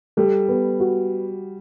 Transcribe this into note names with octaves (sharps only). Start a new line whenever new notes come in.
G3 A4
B3
F#4